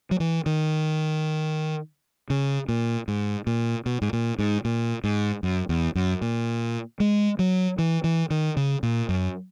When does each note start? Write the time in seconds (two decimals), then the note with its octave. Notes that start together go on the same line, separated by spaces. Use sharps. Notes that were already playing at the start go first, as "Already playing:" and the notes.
0.11 F#3
0.20 E3
0.46 D#3
2.30 C#3
2.69 A#2
3.08 G#2
3.47 A#2
3.86 B2
4.02 G#2
4.13 A#2
4.39 G#2
4.65 A#2
5.04 G#2
5.43 F#2
5.69 E2
5.95 F#2
6.22 A#2
7.00 G#3
7.39 F#3
7.78 E3
8.04 E3
8.30 D#3
8.57 C#3
8.83 A#2
9.09 F#2